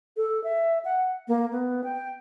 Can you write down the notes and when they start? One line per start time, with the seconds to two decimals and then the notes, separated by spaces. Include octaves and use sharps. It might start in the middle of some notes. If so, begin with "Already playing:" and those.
0.17 A4
0.44 E5
0.85 F#5
1.28 A#3
1.52 B3
1.84 G5